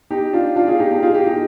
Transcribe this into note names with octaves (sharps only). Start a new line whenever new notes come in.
D#4 G4
D4 F4
D4 F4
F4 G#4
D#4 G4
D#4 G4
F4 G#4
D#4 G4
D#4 G4